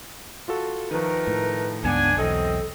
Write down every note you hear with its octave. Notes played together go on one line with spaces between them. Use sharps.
F4 F#4 A4
D#3 F3 A3 A#4 B4
A2
C#2 G2 B3 D4 G#5
B1 E2 C4 A4 D#5